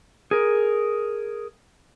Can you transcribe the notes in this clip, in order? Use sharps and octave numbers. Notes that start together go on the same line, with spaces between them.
G#4 A#4